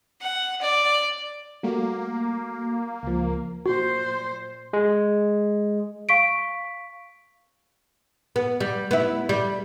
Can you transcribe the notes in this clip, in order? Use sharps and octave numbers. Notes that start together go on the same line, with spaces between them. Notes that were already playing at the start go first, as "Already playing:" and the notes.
F#5
D5
G3 A3 A#3 F#4
C#2 F3
A#2 F#4 C5
G#3
F5 C#6 B6 D7
B3
G3
B3 E4
G3